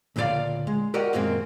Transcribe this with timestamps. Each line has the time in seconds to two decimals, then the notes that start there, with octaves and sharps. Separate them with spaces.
0.16 D2 A#2 C#3 D#4 D5 F5
0.67 G#3
0.94 F#4 G4 A#4 D5 D#5 F#5
1.13 F#2 A#2 D#3 G#3 A#3 C4